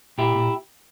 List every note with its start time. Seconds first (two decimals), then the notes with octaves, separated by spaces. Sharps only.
0.18 A#2 E4 G4
0.35 A#2